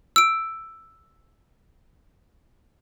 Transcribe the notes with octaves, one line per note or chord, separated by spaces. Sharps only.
E6 D7